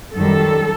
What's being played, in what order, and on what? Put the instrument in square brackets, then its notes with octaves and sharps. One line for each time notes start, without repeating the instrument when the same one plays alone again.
[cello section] F#2 D#3 G3 A4